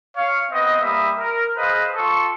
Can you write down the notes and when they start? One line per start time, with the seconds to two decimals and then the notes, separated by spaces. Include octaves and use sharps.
0.17 C#5 F5
0.51 B3 C4 D#5
0.81 G3 A#3 E5 B5 D#6
1.19 A#4
1.57 G#4 B4 C5 D#5 F5
1.97 F4 A4 C#6